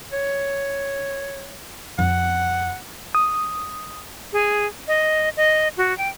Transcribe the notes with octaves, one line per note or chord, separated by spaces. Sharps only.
C#5
F2 C4 F#5
D#6
G#4
D#5
D#5
F#4
G5